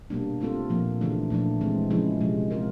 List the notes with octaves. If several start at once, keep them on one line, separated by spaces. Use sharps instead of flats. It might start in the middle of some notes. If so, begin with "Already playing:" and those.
B2 G3 A#3 D4
A3 C4 F4 A4
A#2 F3 A#3
C#3 E3 A3 D4
A#2 F3 A3 D4
E3 G#3 C4
C#3 F3 G#3 C#4 E4
C3 F3 G#3
G#3 C4 F4 A#4